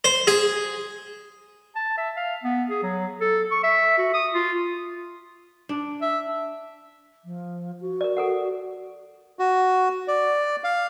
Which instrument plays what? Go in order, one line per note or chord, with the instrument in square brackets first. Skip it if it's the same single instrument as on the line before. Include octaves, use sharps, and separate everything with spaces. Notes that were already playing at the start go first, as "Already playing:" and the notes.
[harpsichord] C5
G#4
[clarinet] A5
E5
F5
B3
G#4
F#3
A4
C#6
E5
F#4
D#6
F4
[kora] D4
[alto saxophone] E5
[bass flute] F3
F#4
[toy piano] A#4 D5
A4 A#4 F#5
[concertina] F#4
D5
F5